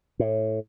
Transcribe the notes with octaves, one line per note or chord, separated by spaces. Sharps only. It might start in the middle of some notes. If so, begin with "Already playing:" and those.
A2